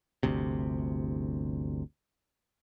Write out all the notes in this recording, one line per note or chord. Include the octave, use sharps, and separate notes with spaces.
G1 D2 C3